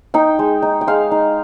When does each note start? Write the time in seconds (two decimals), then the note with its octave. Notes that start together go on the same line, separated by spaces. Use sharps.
0.14 D#4 G5
0.39 G#3
0.62 D#4
0.81 G5
0.87 G#3 F5
1.11 D#4